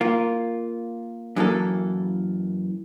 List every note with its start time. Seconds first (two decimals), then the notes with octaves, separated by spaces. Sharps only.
0.01 A#3 F4
1.36 F#2 E3 A#3 A4